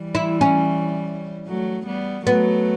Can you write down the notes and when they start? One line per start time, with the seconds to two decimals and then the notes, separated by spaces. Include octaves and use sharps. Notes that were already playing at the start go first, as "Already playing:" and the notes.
Already playing: E3 G3
0.15 E4
0.41 C#4
1.47 F#3 A3
1.86 G3 B3
2.26 F#3 A3 B3